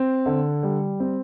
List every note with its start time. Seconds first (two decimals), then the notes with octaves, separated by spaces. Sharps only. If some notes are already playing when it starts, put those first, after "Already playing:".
Already playing: C4
0.26 D3
0.63 G3
1.00 C4